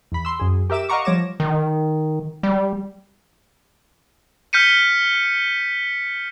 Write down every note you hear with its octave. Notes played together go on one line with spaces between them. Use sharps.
E2 B5
C6 E6
F#2 G#4
G4 A#4 E5 D6 E7
D#5 F5 F#5 A#5 C#6 D6
F3 G3 C#5 D6 A#6 E7
D#3
G3
F6 G6 B6 C#7 D#7